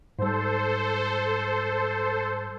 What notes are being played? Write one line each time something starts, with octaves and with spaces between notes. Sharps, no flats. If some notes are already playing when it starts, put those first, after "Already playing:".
G#2 G3 A4 C5